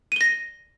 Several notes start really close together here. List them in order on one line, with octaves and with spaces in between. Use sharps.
D#7 G7 A#6